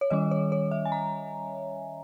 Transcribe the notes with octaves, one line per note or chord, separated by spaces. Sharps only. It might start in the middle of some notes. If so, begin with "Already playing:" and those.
C#5
D#3 G3 C#4 D#5
C#5
C#5
E5
G#5
A#5